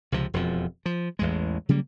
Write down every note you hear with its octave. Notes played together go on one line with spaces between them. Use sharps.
C#2 C3 F3
E1 F2 F3
F3
A1 E2 G#3
C#3 F#3 G3 A#3